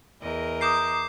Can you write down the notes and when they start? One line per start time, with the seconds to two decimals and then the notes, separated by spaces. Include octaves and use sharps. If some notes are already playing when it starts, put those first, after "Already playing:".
0.22 E2 A#4 D#5
0.61 A#5 D6 D#6 G6 C7